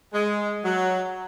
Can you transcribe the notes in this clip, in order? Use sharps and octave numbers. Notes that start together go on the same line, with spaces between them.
G#3
F#3